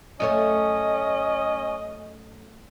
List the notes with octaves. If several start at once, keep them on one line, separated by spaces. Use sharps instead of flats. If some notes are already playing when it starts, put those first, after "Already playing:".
F#2 A3 C#4 C#5 D#5